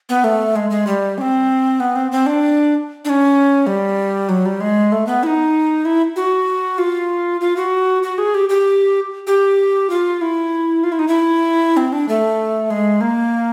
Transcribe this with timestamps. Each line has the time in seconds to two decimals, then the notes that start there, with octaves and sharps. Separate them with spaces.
0.09 B3
0.24 A3
0.56 G#3
0.70 G#3
0.87 G3
1.18 C#4
1.21 C4
1.80 B3
1.96 C4
2.12 C4
2.26 D4
3.05 D4
3.10 C#4
3.67 G3
4.29 F#3
4.45 G3
4.60 G#3
4.92 A3
5.07 B3
5.23 E4
5.27 D#4
5.85 E4
6.16 F#4
6.78 F4
7.41 F4
7.57 F#4
8.03 F#4
8.18 G#4
8.34 G4
8.49 G4
9.27 G4
9.90 F4
10.21 E4
10.84 F4
10.92 E4
10.99 D#4
11.08 E4
11.77 C4
11.93 D4
12.09 A3
12.70 G#3
13.01 A#3